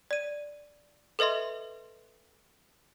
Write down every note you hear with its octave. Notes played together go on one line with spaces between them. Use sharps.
D5 D#7
A4 B4 D#5 E5 C6